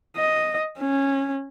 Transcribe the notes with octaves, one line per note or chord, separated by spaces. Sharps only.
D#5
C#4